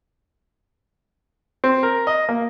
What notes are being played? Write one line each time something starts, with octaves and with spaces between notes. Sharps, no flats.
C4
A#4
D#5
A#3